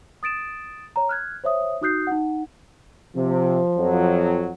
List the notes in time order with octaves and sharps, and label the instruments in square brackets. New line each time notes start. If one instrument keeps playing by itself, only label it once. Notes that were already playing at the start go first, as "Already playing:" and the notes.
[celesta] D#6 A6 D7 E7
C#5 A#5
F6 F#6 G#6
C5 C#5 E5 D#6
D#4 F#4 D#6 F#6 G6 C7
D#4 F#5
[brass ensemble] C3 [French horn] F3
[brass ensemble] F2 F#3